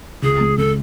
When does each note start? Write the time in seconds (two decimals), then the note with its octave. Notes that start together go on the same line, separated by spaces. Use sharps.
0.22 C#2 G#4
0.41 G#3
0.58 C#3 A4